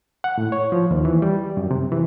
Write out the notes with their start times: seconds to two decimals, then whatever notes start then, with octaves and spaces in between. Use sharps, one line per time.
0.24 F#5
0.38 A2
0.52 C#5
0.72 F3
0.91 D#2
1.05 E3
1.22 G3
1.57 F#2
1.71 C3
1.92 E3